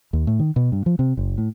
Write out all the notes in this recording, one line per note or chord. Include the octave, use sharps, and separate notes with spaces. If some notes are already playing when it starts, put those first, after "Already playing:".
D#2
A2
D#3
B2
G2
F3
C3
F#1
A2